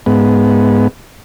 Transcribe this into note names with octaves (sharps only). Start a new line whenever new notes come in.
G#2 B3